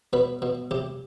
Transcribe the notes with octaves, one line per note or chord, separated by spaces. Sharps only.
B2 B4
B2
C3 G4